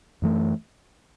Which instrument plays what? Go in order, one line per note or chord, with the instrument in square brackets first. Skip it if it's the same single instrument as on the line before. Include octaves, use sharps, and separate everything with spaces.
[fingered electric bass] F#2 E3 A3